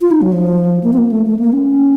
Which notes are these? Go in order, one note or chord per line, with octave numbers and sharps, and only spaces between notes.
F4
D#4
F#3
F3
A#3
C4
A#3
A3
A3
A#3
C#4